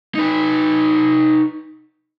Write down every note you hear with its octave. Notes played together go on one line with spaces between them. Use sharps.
D#4 B4